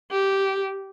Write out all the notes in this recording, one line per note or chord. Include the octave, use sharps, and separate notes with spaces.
G4